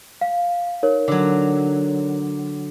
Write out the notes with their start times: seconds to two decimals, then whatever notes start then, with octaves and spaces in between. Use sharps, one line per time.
0.21 F5
0.83 D#4 A#4 C#5
1.08 D3 F#3